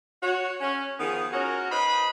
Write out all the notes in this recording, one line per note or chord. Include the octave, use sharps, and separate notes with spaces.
F#4 C#5
C#4
D#3 F3 B3 G#4
C#4 F#4 A#4
D#4 B4 C5 D#5 B5